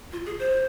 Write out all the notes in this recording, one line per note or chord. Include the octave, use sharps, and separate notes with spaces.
F4
G#4
C5